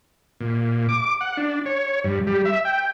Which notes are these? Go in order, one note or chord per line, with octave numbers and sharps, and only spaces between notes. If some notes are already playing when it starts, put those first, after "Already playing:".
A#2
D6
F#5
D4
C#5
G2
G3
E5
G5